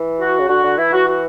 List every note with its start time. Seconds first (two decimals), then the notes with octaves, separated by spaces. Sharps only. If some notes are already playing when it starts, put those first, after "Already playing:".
Already playing: E3
0.20 F#4
0.40 C#3
0.48 D3 F#4
0.64 D3
0.77 E3 E4
0.93 F#4
1.07 F#4